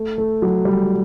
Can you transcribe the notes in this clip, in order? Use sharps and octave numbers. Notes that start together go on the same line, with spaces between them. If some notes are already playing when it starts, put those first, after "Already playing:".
Already playing: A3
A3
F#3
G3